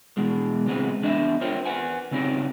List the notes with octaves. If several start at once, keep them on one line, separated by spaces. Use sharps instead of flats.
B2 E3 G#3
A#2 C#3 E3 G#3 B3 C4
E2 D4 D#5 E5
F4 A#4 C5 C#5 G5
B4 F#5 G#5
C#3 C4 C#4 D#4 G4